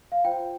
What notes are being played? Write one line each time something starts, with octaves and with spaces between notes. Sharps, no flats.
F5
F4 C5 G5